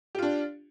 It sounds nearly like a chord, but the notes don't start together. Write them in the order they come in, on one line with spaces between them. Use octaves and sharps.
G4 F4 D4